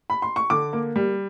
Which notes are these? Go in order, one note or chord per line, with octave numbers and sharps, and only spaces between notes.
B5
C6
C#6
D3 D6
A#3
G3